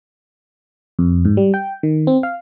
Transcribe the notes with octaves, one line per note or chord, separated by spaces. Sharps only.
F2
G#2
G3
G5
D#3
C4
F5